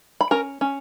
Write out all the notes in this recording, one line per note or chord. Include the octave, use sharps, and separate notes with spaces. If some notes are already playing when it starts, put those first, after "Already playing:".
B5
C#4 A#4 A#5
C#4